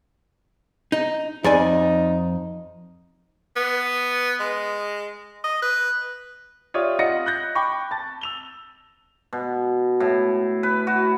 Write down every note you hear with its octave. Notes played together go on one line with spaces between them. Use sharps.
D#4
F2 D#4 D5 G#5
B3
G#3
D#5
B4
F4 G4 C#5 D5 E5 D#6
F4 D#5 F#5 D#6 A#6 C#7
F#6 G6 A#6
G5 B5 C#6 D6
A5 A6
E6 F7 G7
B2
A2
B4
F#4